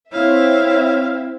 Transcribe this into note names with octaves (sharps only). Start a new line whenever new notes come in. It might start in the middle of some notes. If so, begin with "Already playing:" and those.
C4 E4 C#5 E5 F5